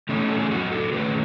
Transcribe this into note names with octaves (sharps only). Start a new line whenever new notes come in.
E3 A3 C#4 D#4
A4
G#4
F#2 D#4 F#4
F#4 A4
D#3 A3 C#4 G#4 B4